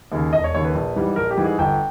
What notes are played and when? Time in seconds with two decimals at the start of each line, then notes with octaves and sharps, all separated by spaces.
0.12 D#2 C#3
0.33 E1 D#5
0.44 C#5
0.55 D#2 C#3 C#5
0.64 B4
0.74 A#1
0.96 G#2 E3 G3
1.16 A#1 A#4
1.31 G4
1.37 G#2 E3 G3
1.44 G#4
1.58 G1 G5